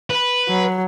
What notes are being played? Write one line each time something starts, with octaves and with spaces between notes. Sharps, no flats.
B4
F#3